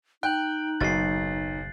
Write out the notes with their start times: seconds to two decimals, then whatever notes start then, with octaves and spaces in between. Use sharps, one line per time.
0.23 D#4 G5 F#6 G6 F#7
0.81 F#1 B1 B2 A6 C7